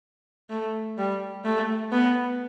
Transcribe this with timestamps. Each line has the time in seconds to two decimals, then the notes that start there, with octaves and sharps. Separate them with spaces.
0.50 A3
0.98 G3
1.45 A3
1.92 B3